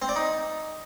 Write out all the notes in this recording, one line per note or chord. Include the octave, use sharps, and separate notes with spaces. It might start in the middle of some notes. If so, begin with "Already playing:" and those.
C4
D5
D#4